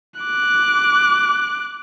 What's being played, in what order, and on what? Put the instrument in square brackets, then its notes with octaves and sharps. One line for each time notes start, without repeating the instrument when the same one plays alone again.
[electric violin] D6 F#6